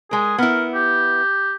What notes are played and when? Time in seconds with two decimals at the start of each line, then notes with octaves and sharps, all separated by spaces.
0.11 G#3 G#4 A#4
0.38 B3 E4 A#4
0.75 G4